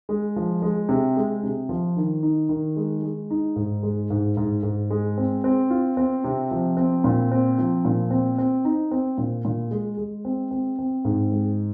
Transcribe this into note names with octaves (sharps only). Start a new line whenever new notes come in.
G#3
F3
G#3
C3
G#3
C3
F3
D#3
D#4
D#3
G#3
G#3
D#4
G#2
G#3
G#2
G#2
G#2
G#3
C4
C4
F4
C4
C3
F3
C4
A#2
C4
F3
A#2
C4
C4
D#4
C4
A#2
A#2
G#3
G#3
C4
C4
C4
G#2
G#3